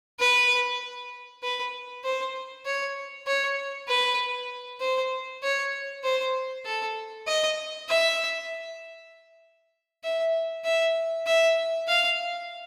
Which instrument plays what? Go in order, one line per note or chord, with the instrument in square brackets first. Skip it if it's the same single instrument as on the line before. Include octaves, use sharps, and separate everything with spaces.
[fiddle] B4
B4
C5
C#5
C#5
B4
C5
C#5
C5
A4
D#5
E5
E5
E5
E5
F5